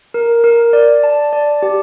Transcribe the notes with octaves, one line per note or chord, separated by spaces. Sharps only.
A#4
A#4
D5
A5
D5
G4